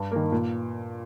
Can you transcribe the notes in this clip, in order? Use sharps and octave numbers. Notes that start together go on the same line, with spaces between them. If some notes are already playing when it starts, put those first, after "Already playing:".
Already playing: G2
D#3 A#3
A#2